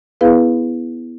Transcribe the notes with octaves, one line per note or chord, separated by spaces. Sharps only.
B3 E4 G#4 B4 F5